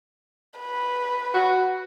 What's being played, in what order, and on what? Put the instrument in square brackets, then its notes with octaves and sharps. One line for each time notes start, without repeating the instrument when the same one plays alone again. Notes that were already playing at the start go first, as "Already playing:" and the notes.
[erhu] B4
[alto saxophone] F#4